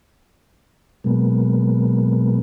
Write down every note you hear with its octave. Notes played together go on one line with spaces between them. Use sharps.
B2 F#3 G#3 A#3 B3